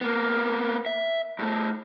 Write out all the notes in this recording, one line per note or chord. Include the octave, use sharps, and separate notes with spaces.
A#3 B3
E5
G2 A3